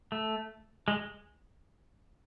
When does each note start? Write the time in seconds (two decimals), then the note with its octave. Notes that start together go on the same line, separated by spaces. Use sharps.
0.12 A3
0.88 G#3